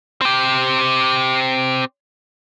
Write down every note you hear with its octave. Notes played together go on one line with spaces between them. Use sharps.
C4 G4